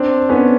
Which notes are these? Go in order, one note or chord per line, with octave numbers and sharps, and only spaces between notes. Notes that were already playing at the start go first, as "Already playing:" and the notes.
Already playing: C4 D4
B3 C#4